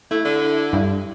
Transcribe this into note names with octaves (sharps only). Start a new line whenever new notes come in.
A3 E4
D3
G2